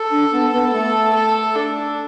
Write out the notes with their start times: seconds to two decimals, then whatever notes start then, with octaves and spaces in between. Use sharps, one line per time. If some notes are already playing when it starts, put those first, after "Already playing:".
Already playing: A4
0.11 D4
0.32 B3
0.52 B3
0.72 A3 A4
1.14 A4
1.55 D4